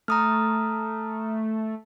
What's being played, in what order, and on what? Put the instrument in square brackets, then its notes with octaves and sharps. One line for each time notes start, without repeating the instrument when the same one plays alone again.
[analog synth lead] A3 [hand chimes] A#5 D#6 F6